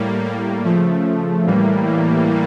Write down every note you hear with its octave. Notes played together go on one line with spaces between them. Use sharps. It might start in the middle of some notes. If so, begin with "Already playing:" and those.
Already playing: A2 G3 A#3
A#3
C#3 F3 A3
A2 E3 G3 A#3
A#3